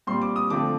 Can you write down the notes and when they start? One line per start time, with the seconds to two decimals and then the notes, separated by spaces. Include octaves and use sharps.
0.07 A#2 G3 C4 C6
0.22 D6
0.36 D#6
0.50 D3 F3 A3 C4 D6